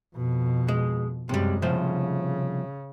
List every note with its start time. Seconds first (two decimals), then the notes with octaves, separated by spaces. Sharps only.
0.16 F2 B2
0.68 G#3
1.29 F#2 C3 G3 G#3
1.62 C2 C#3 F3 C5